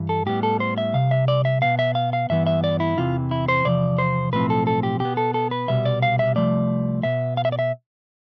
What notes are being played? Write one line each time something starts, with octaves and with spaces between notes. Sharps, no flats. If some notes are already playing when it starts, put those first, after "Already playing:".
Already playing: G2 E3
A4
A2 G3 B3 G4
A4
C5
E5
C2 C3 F5
E5
D5
E5
B2 B3 F5
E5
F5
F5
G2 E3 B3 E5
E5
D5
E4
E2 C3 E3 F4
E4
C5
E2 C3 F3 D5
C5
B1 A2 F3 C4 B4
A4
A4
G4
B2 B3 G4
A4
A4
B4
C2 B2 G3 B3 E5
D5
F5
E5
C2 C3 F3 A3 D5
B2 B3 E5
F5
E5
D5
E5